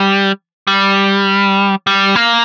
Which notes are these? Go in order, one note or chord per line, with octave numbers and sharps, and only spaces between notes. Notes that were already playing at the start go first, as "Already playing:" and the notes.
Already playing: G3
G3
G3
A#3